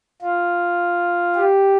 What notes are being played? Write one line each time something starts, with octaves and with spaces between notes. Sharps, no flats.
F4
G4